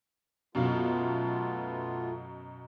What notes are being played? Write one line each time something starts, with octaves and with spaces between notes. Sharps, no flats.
F#2 B2 A3 B3 F4 F5